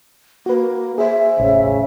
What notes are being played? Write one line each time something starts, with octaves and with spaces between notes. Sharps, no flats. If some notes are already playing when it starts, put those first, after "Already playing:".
A#3 F#4 B4
G#4 C5 E5
E1 A1 C#3